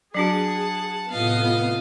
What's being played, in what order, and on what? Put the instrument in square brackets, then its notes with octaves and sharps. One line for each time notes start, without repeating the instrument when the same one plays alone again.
[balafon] F#3 D4 F#4 [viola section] G#4 [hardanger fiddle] F#5 A5
[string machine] A2 C3 F4 [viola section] B3 [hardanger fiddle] D#5 F5